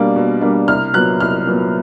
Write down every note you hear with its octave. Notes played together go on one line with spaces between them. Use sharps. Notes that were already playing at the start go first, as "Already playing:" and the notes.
Already playing: B2 G3 A#3 D4
B2
G3 A#3 D4
C2 F6
A#2 F#3 B3 F#6
C2 F6
A#2 F#3 B3